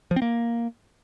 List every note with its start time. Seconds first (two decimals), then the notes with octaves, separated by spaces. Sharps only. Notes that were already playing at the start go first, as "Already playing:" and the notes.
0.11 F3
0.16 C4
0.22 A#3